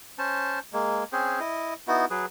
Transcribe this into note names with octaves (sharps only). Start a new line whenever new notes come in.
C#4 C5 A5
G#3 A#3
C4 C#4 G#4 C5
E4 D#5
B3 D#4 E4 F#4
F#3 G#4 B4